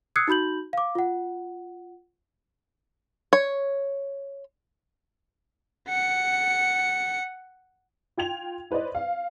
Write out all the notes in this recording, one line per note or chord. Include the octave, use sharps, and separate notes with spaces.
D#6 E6 F#6 G#6 C7 C#7
D#4 F#4 B5 G6 F#7
F5 D6
F4 F#5
C#5
F#5 C#7
F4 G5 G#6 F7
E4 B4 C5 D5 D#5
F5